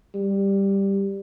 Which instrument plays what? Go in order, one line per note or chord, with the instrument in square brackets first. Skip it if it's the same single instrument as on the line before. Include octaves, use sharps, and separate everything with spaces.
[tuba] G3